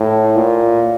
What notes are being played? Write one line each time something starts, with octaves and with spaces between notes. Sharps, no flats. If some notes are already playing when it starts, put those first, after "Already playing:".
Already playing: A2
A#2